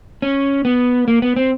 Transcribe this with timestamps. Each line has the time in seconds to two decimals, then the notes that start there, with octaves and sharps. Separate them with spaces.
0.22 C#4
0.65 B3
1.08 A#3
1.22 B3
1.36 C4